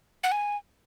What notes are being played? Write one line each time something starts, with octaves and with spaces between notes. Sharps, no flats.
F#5
G#5